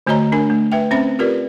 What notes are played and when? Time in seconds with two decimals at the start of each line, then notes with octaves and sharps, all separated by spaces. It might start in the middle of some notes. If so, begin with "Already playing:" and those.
0.06 D3 A3 F#4 C#5 D#5 A#5
0.32 D4 A#4 G#5
0.50 A3
0.72 B4 E5 G5
0.91 C4 C#4 C5 E5 B5
1.19 F4 G4 A#4 B4 D5